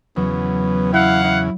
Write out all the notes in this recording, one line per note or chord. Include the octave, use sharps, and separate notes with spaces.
E2 C#3 F#3 B3
E4 F5 F#5
E4